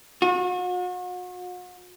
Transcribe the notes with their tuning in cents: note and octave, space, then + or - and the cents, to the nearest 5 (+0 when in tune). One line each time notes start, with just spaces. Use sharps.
F#4 -40